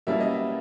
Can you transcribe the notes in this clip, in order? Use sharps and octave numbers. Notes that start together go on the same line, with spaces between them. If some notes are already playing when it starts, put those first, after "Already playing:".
B2 G3 A#3 C#4 E4 E5
D#5
E5